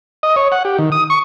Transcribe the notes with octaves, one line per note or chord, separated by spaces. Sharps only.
D#5
C#5
F#5
G4
D#3
D#6
C#6